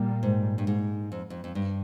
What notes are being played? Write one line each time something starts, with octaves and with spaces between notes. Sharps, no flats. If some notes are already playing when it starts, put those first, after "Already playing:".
Already playing: A#2 G3 A#3
G#2
G2
G#2
F2
F2
F2
G2